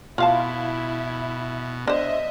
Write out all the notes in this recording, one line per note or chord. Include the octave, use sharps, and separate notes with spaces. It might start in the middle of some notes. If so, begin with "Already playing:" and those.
B2 E4 F4 F5 A5
D4 C5 D#5 E5